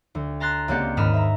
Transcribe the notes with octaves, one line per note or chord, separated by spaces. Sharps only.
D2
A5 A#5 C6 F#6 A6
C#2 A#3 C4 G4 D5 F#5
D#2 G#2 B5 D#6 F6 E7
E5 A#5